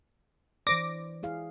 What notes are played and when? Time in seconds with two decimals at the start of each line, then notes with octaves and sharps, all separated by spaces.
0.67 E3 C5 D5 D6 A#6
1.23 E4 G#4 F5